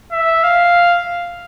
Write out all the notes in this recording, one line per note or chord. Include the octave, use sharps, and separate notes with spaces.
E5
F5